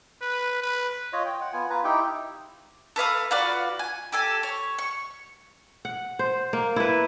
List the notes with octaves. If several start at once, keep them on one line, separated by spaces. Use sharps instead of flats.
B4
B4
F4 C#5 D#5
G5
F#5
B3 F4 G#5
F4 B4 A#5
D#4 E4 G4 G5
A4 B4 F5 D#6
F4 F#4 B4 D5
G#5
G4 A4 G#5
C#5
C#6
F#5
C5
A#3
E4 B4